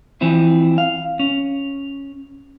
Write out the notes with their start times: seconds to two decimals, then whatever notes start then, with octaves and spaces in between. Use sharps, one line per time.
0.21 E3 F3 C4 E4
0.78 F5
1.19 C#4